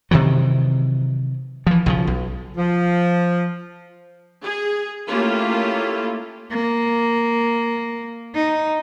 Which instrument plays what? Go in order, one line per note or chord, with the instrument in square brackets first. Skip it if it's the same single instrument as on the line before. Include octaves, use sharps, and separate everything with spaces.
[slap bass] C3 D#3 E3 F#3
E3 F3
B1 C#3 F3
B1
[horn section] F3
[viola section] G#4
A3 A#3 C#4 E4 F4 G4
[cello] A#3
D#4